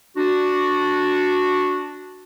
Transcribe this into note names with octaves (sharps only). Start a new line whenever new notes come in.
D4 F#4